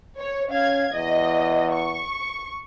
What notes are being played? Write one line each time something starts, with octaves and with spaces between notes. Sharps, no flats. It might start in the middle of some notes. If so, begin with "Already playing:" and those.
C#5
C#4 F5 G#6
E2 D#5
C#6